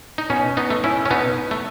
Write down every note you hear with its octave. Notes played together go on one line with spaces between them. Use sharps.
D#4
B2 C#4
B3 D#4
A3
C#4 E4
C#4
B2 B3 D#4
A3